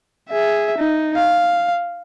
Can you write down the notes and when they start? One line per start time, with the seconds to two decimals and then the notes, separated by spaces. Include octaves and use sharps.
0.30 G#4 E5
0.78 D#4
1.16 F5